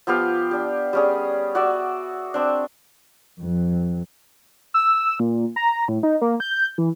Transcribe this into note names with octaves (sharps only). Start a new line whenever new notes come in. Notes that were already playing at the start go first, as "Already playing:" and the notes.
F3 B3 G4 F5
D4 G4
G3 C#4 G#4
F#4 D5 E5
C4 D4
F2
E6
A#2
A#5
A2
D#4
A#3
G6
E3